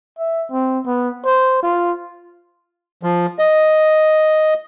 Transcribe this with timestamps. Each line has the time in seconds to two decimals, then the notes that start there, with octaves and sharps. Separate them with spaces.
0.18 E5
0.51 C4
0.86 B3
1.25 C5
1.63 F4
3.03 F3
3.39 D#5